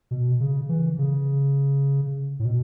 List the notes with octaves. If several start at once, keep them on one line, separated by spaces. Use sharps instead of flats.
B2
C#3
E3
C#3
A2
B2